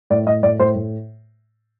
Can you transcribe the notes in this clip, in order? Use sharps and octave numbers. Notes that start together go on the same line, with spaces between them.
A2 D5
A2 D#5
A2 D5
A2 C5
A2